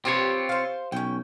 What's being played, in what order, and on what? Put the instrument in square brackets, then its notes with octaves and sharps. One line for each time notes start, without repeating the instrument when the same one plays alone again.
[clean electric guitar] C4 F4 C#5 [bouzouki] G4 G#4 B4
[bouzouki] C5 F5
[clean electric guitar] B1 [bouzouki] C#4 G5